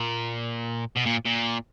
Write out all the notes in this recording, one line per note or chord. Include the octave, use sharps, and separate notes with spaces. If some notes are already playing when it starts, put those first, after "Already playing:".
Already playing: A#2
B2
A#2
A#2